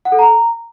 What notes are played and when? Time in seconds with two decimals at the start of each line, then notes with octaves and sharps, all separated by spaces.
0.05 F#5
0.12 A4
0.19 A#5